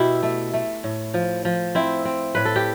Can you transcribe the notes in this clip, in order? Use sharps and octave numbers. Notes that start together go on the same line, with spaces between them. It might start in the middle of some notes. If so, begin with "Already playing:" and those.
Already playing: B2 E4 G4
A3
A3
A2
F3
F3
C4 E4
C4
A2 B4
A4
G4